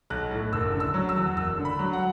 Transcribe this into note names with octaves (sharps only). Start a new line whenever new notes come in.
B1 F#6
A2
F#1 E6
D3
E6
F#3
E6
E2
F#1 E6
D3
B5
F#3
F#5